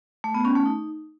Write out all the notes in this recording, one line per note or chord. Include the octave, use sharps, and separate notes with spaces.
A3
B3
C#4
A3
D#4